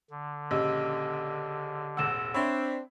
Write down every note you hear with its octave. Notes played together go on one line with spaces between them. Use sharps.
D3
A#1 C#3 G4 D#5 E6
E1 A1 F#5 E6 E7
C4 D4 C#5 E5 B5